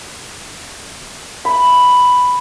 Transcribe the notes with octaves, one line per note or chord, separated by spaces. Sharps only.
B5